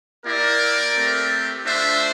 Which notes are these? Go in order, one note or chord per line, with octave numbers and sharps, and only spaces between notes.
A#3 E4 G4 A#4 D5
A3 C4 G4
A3 D4 F4 C5 E5